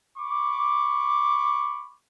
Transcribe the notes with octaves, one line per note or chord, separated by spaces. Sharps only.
B5 C#6 D6